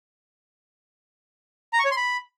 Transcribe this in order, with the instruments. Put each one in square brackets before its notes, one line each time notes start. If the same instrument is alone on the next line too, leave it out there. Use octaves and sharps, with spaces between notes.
[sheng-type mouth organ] A#5
C#6
C#5
C6
B5